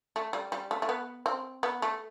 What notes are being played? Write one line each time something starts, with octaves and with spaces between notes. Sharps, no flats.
A3
G3
G3
A3
A3
B3
C4
B3
A3